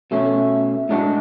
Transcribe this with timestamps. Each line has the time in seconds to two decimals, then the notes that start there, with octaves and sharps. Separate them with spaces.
0.11 B2 A3 C#4
0.89 A2 G#3 D4 F#4